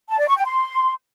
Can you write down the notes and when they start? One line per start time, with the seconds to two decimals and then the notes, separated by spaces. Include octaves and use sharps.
0.10 A5
0.19 D5
0.28 C#6
0.37 G5
0.46 C6